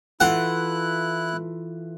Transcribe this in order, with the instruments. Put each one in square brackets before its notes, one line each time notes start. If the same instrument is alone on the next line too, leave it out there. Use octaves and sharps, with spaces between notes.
[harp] E3 F4 A4 [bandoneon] E4 F#6 [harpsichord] F#5